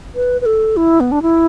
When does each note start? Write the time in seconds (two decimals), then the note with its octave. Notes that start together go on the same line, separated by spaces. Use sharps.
0.15 B4
0.41 B4
0.46 A4
0.77 E4
1.00 B3
1.12 D4
1.22 E4